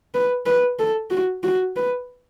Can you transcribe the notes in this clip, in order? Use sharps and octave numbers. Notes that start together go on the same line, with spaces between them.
B4
B4
A4
F#4
F#4
B4